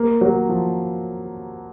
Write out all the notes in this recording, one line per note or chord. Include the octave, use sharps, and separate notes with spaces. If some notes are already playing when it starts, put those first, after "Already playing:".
Already playing: A#3
F#3
F3